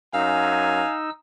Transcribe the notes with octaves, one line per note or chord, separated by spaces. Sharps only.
F#2 D#4 F5 G#5 E6